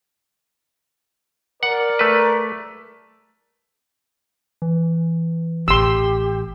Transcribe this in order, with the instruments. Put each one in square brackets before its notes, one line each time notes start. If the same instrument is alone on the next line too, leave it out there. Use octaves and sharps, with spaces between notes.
[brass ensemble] A#4 D5 [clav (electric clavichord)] F#5
[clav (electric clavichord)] A3 B4
[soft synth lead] E3
[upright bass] A1 [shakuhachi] G4 [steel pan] C6 E6